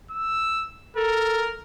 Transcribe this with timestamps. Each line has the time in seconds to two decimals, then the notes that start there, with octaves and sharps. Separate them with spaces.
0.11 E6
0.96 A4 A#4